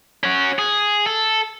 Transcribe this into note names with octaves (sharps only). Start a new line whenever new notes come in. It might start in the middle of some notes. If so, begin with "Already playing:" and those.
C#4 F#4
G#4
A4